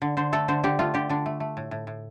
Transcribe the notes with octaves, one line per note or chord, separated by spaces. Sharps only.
D3
D3 C5
A3 A4
D3 C5
D3 G4
A3 F4
D3 G4
D3 D4
A3
A3
A2
A2
A2